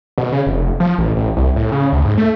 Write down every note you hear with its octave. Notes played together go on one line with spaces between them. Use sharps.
B2
C#3
F1
F3
A1
A1
C2
A2
C#3
D2
G#2
A3